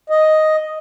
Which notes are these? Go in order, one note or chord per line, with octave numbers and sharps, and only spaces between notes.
D#5